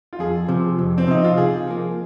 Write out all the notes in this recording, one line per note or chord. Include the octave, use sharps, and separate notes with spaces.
F4
F2 G#4
C3 F3
F2
C4
C3 F3 D#4
F4
C3 G#4
F3 A#3